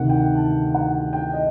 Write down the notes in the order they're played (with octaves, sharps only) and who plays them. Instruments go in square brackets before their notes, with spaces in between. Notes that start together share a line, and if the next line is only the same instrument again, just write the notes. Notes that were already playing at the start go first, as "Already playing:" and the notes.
Already playing: [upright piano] D2 C3 D#3 F#5
G5
A5
F#5
G5
D#5